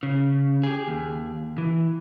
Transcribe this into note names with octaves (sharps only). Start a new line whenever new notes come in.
C#3
G4 G#4
D#2
E3